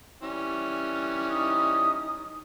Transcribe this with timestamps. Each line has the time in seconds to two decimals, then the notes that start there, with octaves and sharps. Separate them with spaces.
0.23 E3 G3 C#4
1.30 D#4 D#6